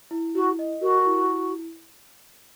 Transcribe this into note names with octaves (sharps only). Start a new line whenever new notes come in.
E4
E4 F#4
D#5
F#4 A#4
E4
E4